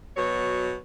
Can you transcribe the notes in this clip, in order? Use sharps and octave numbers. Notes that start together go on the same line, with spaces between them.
B2 F#3 C#5